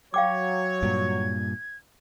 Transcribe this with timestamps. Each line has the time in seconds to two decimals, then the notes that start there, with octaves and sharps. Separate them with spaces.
0.14 F#3 C#5 F5 G5 D6 G#6
0.83 G2 A#2